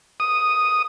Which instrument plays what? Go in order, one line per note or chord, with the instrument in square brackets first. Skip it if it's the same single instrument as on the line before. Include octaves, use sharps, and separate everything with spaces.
[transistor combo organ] D#6